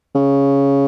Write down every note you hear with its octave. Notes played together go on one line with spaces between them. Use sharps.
C#3